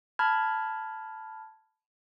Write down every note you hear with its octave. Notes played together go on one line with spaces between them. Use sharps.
A5 B5 F6 G#6